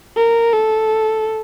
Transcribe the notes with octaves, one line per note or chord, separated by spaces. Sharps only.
A#4
A4